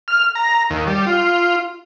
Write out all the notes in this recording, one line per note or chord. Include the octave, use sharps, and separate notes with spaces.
F6
A#5
D#2
G3
F4